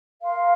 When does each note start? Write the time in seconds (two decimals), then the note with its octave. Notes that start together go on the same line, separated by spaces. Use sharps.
0.20 A#4 F5 C6